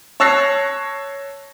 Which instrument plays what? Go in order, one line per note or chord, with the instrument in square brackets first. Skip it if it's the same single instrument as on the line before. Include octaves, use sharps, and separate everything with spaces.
[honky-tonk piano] C#5 A5 E6 F#6 A#6 C7